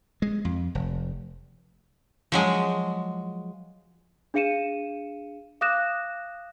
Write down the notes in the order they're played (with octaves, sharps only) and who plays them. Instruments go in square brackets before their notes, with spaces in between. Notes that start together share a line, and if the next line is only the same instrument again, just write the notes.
[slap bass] G#3
F2
F1
[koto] F3 F#3 G#3
[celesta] D4 G#4 F5 C#7 D#7 E7
F5 D6 D#6 F#6 A#6 E7